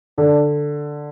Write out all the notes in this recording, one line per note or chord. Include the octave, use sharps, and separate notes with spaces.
D3 D4